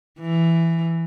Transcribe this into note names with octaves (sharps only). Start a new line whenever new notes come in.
E3